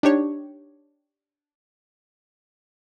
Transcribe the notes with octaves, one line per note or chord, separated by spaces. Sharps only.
D4 D#4 G4 C#5